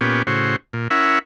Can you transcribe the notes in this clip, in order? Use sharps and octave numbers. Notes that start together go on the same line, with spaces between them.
A#2 B3 C#4 G4
A2 C#3 F#4 C5
A#2
C#4 E4 A#4 E5 F#5